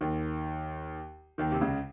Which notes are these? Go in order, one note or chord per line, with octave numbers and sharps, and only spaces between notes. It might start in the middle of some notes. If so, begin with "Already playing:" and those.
D#2 D#3
D#2 D#3
C3
C#2 C#3